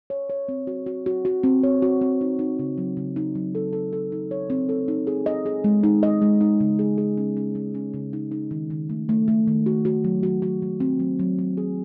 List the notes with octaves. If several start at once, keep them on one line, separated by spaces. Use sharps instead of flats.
C#5
C#5
C4
F#4
F#4
F#4
F#4
C4
C#5
F#4
C4
D#4
D#4
C#3
F#3
C#3
D#4
F#3
A4
A4
A4
D#4
C#5
C4
A4
D#4
G#4
D#5
G#4
G#3
D#4
D#5
G#3
D#4
C#3
G#4
G#4
C#4
C#4
G#3
C#4
C#3
D#4
D#4
D#3
D#3
A3
A3
A3
D#3
F#4
F#4
F#3
F#4
F#4
F#3
C4
F#3
F#3
F#3
G#4